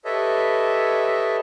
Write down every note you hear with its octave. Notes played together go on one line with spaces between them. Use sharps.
G4 A4 B4 C#5 D#5 E5